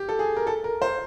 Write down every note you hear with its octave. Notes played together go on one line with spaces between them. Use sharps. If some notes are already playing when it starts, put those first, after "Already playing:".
Already playing: G4
A4
G#4
A#4
A4
A#4
C5